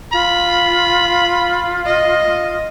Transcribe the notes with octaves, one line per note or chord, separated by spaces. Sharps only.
F4 B5
D#5